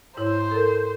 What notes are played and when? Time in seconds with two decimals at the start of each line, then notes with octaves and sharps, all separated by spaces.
0.17 G#2 E4 C5 C#5
0.51 A4 A#4